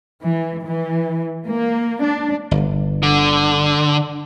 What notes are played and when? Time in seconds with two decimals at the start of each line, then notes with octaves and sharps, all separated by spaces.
0.22 E3
0.64 E3
1.46 A#3
2.02 D4
2.51 G1
3.03 D3